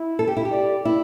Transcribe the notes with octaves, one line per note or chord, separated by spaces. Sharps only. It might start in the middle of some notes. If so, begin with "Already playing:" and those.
Already playing: E4
A4
G4
E4
G4
D5
E4